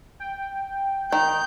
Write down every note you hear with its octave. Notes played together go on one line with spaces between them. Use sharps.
G5
D#3 G6